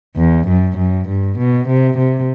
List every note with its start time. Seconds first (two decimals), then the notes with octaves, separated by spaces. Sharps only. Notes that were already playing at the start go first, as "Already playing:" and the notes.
0.16 E2
0.48 F#2
0.77 F#2
1.08 G2
1.38 B2
1.68 C3
1.98 C3